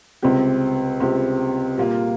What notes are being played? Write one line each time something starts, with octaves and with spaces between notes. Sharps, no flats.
C#2 C3 G3 C4 G4
C#2 C3 G3 C4 G4
A#2 G3 A#3 F4